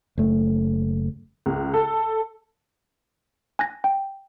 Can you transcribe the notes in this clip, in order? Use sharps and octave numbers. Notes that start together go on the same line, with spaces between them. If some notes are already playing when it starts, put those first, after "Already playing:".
F#1 A3
C#2
A4
G#5 F#6 A#6
G5